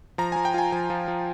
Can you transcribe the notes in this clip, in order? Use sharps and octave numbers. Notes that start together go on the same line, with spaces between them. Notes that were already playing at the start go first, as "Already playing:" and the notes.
F3 A#5
F3 G#5
G5
F4 G#5
F3 G#5
F3
F3